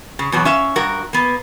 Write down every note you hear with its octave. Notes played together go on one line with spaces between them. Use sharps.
C#3
E2 B2 F#3
C#4 E5 F5
G2 F#4 A#4
A#3 B3